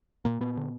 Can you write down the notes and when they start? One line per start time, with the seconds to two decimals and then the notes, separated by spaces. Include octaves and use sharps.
0.25 A#2 A#3
0.40 A#2 B3
0.57 D3